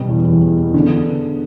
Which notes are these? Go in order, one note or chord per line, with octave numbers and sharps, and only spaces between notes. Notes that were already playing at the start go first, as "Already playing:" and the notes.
Already playing: B2 G3
E2
E2
E2
B3
D3